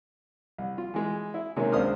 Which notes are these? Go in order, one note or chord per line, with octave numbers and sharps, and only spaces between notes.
C2
F4
E3 G#3
E4
C3 D#3 G#3 A#3 C4 C#4
C#2 D4 C5 D#6 F6